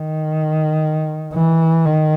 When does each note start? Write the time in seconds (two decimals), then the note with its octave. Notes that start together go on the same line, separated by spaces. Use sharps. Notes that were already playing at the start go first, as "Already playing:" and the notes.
Already playing: D#3
1.34 E3
1.85 D#3